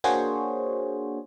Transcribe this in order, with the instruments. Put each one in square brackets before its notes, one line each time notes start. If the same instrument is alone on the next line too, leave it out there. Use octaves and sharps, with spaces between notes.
[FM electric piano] A#3 D4 F#4 G#4 C5 C#5